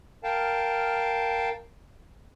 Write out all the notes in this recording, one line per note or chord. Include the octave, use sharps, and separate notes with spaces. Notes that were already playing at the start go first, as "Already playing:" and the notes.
A#4 F5 G5 A5